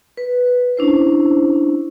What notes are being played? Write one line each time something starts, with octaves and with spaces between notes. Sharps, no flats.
B4
C#4 D4 E4 C5